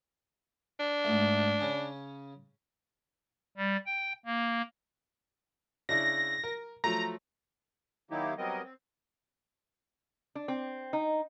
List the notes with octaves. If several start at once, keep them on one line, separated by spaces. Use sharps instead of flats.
D4
G#2 A3
C#3 C#4
G3
G5
A#3
C#3 D4 E4 A#6
A#4
F3 F#3 A3 A#5
D#3 F#3 A#3 D#4 E4 G4
F#3 G3 B3 C4 A#4 D#5
C4
D4
C4
D#4